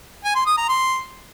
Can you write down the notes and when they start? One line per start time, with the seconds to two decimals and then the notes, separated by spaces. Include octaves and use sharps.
0.24 G#5
0.35 C6
0.46 D#6
0.57 A#5
0.68 C6